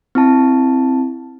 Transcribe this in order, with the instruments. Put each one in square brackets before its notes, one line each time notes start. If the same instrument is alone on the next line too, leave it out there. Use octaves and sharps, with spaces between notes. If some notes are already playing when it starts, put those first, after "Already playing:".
[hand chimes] C4 E4 A5